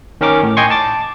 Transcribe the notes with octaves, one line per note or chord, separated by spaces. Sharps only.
D#3 C#4 A#4 D6
A2
D#5 G5 G#5 C6 C#6
A5 D6 A6